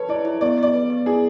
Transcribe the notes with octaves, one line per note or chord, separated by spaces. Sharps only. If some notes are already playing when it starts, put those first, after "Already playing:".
Already playing: A4 B4 C#5
E4 D5
E4
B3 D5
B3 D5
B4
B3
E4 G#4